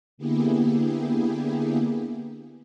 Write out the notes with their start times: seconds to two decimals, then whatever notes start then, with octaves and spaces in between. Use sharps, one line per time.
0.18 D3 A#3 B3 E4 G4 G#4